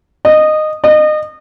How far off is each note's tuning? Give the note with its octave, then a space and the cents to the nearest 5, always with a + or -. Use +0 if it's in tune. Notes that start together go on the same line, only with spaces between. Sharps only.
D#5 -15
D#5 -30